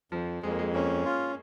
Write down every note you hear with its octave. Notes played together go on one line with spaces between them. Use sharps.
F2 F3
F2 G#3
A#3
G#3
A#3 C#4
F4